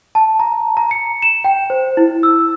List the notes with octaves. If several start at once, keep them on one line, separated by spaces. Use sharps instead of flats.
A5
A#5
A#5
C#7
E7
G5
C5
E4
E6